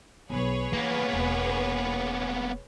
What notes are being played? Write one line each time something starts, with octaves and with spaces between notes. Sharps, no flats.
B1 F#3 G#4 B4 C#5
E3 A#3 B3
E1